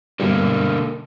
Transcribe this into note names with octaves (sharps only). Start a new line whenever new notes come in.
G2 B2 D3 G3 A#3